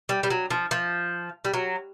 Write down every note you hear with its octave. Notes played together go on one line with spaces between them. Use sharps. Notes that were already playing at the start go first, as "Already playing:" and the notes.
G3
G3
F#3
F3
F3
G3
F#3